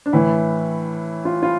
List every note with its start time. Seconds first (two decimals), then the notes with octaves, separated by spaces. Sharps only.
0.06 D4
0.13 A2 E3 E4
1.25 F4
1.43 F4